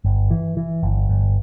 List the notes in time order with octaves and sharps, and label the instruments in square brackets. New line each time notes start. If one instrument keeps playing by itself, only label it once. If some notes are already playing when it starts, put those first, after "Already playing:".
[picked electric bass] G1
E3
E3
G1
G1